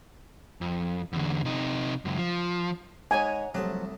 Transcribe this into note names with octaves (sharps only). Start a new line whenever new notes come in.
F2
E2 D3
C3 D#4
C#2 F#2
F3
G#2 G#3 C#5 F#5 G#5 A#5
C2 A2 F3 F#3 A5